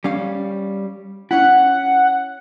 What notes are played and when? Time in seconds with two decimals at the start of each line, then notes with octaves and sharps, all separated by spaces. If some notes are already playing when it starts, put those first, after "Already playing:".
0.04 G3 C#4 F5
1.31 C#4 E4 F#5